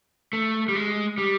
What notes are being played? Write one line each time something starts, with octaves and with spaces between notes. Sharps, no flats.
A3
G3
G#3
G3